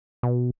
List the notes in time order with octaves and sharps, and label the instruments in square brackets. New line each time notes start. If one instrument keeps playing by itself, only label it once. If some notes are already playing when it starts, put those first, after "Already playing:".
[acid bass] B2